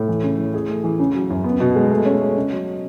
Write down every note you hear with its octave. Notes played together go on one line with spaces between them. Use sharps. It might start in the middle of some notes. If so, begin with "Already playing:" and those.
Already playing: A2
E3
C#3
E3
G#4
A3
E3
C#3
F#3
F#2
B3
B2
G#3
A3
C#4
A3
C#3
F#3